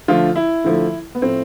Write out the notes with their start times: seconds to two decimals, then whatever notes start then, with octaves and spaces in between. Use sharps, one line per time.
0.08 D3 F3 A3 F4
0.36 E4
0.64 D3 F3 A3
1.15 B3
1.22 A2 F3 A3 C4